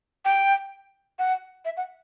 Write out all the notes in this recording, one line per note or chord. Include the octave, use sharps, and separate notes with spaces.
G5
F#5
E5
F#5